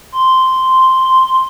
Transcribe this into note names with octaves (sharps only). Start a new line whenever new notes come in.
C6